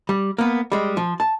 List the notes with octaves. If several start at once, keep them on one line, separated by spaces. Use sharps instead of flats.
G3
A#3 B3
G3 G#3
F3
A5